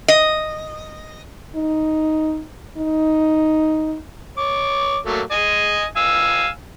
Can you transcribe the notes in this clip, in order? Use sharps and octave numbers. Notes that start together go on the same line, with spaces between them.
D#5
D#4
D#4
C#5 D6
F#3 A3 A#3
D#5 G#5
F5 G#5 E6